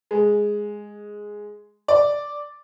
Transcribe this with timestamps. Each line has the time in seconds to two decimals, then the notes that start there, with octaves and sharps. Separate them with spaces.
0.11 G#3
1.88 D5